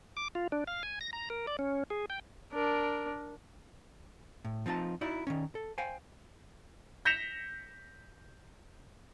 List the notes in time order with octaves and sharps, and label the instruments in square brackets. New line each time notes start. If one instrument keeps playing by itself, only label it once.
[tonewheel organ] D6
F4
D4
F5
G#5
A#6
A#5
A#4
D5
C#4
G#4
G5
[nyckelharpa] D4 A#4
[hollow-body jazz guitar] A2
F3 C4 D#4 F4 A5
D#4 E4 F#4 D5 E5
D#3 E3 C#4
A4
C5 F5 G5 G#5
[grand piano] G6 A#6 B6 C#7 E7 F7